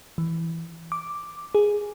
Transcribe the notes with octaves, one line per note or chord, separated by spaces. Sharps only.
E3
D6
G#4